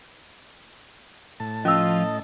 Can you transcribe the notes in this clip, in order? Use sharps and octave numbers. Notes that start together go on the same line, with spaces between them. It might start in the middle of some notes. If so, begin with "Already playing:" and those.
A2 A5
F3 C#4 F4 D#5 E6